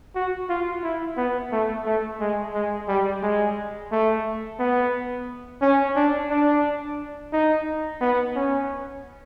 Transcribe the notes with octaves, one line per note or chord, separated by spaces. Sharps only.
F#4
F4
E4
B3
A3
A3
G#3
G#3
G3
G#3
A3
B3
C#4
D4
D4
D#4
B3
C#4